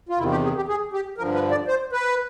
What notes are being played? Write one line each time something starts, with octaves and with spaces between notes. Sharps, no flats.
F4
E2 C3 D#3 E4
G4
G#4
G4
G#4
G4
G2 D3 F3 A#4
B4
D5
C5
B4